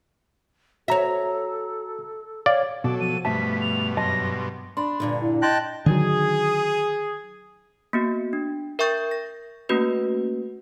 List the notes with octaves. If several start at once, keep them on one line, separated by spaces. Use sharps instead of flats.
F#4 A4 C#5 E5 A#5
C#5 D5 F5
B2 F#3 A4 D6
F3 D#7
G2 B2 A3 E5 A5 B6
F7
F#2 D#5 A5 C6 A#6
D4 B5 C6
G2 A#2 D3
E4
D#5 G5 A5 C6 F#6 A#6
D3 D#3 F#3 G#4
A#3 B3 F#4
D4
A#4 E5 G5 C#6 G6 A6
A#6
A3 A#3 C#4 F#4 B4